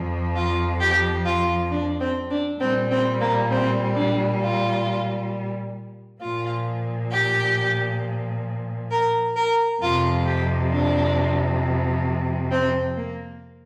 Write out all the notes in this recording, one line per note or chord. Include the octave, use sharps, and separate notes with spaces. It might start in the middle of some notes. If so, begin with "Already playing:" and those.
Already playing: F2 F3
F4
G4
F4
D4
C4
D4
A#2 G3 C4
C4
A#3
C4
D4
F4
A#2 F3 F4
G4
A#4
A#4
F2 C3 F3 F4
G4
D4
C4
A#3